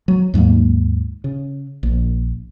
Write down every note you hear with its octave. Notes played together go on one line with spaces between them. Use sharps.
F#3
D#2 G#2 F#3 A#3
C#3
A#1